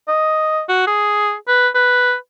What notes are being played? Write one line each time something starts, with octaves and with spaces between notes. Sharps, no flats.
D#5
F#4
G#4
B4
B4